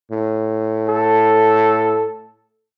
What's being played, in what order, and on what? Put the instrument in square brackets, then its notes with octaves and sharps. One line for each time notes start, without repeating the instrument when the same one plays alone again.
[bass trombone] A2
[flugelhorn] A4